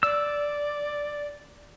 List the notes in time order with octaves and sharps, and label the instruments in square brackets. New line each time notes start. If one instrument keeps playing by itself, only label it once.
[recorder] D5 [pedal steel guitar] E6